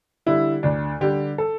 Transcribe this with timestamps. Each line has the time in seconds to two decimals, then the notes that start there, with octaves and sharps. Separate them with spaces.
0.26 D3 G3 E4
0.63 D2 D4
1.01 D3 G3 G4
1.38 A4